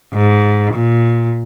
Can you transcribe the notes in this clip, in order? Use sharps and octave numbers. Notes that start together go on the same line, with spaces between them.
G#2
A#2